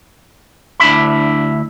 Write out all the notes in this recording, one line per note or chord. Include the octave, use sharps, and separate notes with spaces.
D2 D4 E4 E5 B5